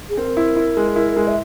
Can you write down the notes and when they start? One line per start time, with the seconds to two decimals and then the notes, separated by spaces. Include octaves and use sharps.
0.09 G#4
0.17 C4 A#4
0.37 E4
0.56 E4
0.77 G#3
0.96 E4
1.17 G#3
1.27 E5